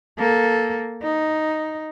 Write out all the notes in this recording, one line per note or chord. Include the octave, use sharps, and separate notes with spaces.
A#3 A4
D#4